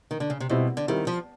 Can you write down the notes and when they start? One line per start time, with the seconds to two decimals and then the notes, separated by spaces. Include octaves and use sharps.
0.11 D#3
0.20 D3
0.30 C#3
0.40 C3
0.49 B2 G3 C4 E4
0.77 D3
0.88 D#3 G3 C4 E4
1.07 F3